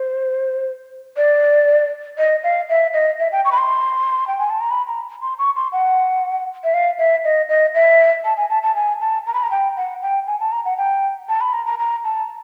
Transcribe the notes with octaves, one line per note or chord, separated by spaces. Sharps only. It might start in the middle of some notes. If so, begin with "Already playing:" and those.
Already playing: C5
D5
D#5
F5
E5
D#5
E5
G5
C#6
B5
C6
G5
G#5
A5
A#5
B5
A#5
C6
C#6
C6
F#5
E5
F5
E5
D#5
D#5
E5
A5
G#5
A5
A5
G#5
A5
A#5
B5
A#5
G5
F#5
G5
G#5
A5
A#5
F#5
G5
A5
B5
A#5
A#5
A#5
A5